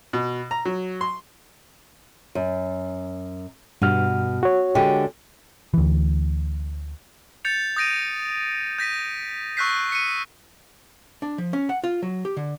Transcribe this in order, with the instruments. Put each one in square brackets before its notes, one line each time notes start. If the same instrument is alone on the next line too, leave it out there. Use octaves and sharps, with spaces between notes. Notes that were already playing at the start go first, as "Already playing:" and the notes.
[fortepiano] B2
A#5
F#3
C6
[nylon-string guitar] F#2
[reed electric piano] G2 F6 [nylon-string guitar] B2
[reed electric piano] F#4 C#5
[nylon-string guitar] D3 G#3 G4
[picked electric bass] D2 E3
[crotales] G6 A6 C#7 F7
D#6 G6 A#6 D7 D#7
G6 A#6 B6 D#7
C#6 E6 F#6 G6 B6 C7
C#7 D#7
[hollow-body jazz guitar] D4
F3
C#4
F#5
F4
F#3
G4
D3